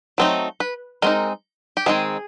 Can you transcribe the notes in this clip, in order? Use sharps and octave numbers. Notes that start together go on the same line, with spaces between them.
F#3 A3 C4 D#4
B4
G#3 C4 D#4 A#4
G4
D#3 G#3 C4 G#4